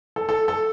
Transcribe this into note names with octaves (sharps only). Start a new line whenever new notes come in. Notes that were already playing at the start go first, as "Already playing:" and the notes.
A4
A4
A4